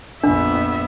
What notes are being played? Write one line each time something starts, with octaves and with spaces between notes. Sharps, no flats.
A#1 F2 B3 D4 E5